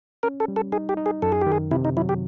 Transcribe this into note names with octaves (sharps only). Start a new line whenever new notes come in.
C#4 A#4
A4
G3
A4
D#4 G#4
G4
D#4
G#4
F#2 A4
G#4
G4
D#3
G#4
C3 E4
D#4
F#3 E4
G4